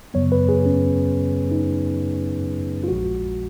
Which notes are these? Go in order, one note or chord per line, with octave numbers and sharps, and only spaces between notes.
F#2 C#3 F#3 B3 C#5
B4
G#4
C#4
D#4
F4
A#1 A#2 F3 G#3 F#4